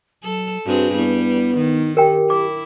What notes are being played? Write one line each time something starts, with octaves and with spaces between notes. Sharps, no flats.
F#3 A4
G2 C4 F#4 G#4
G3 B3 E4
D#3 D#4
G4 A#4 G5
E4 D6